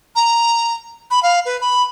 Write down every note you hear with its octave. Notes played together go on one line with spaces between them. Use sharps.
A#5
B5
F5
B4
B5